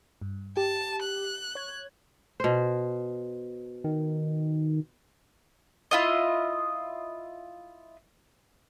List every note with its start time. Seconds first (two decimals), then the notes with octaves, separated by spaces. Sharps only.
0.21 G2
0.57 G4 A5
1.02 F#6
1.55 C#5 G#6
2.40 B2 C5
3.84 D#3
5.91 E4 F4 D#5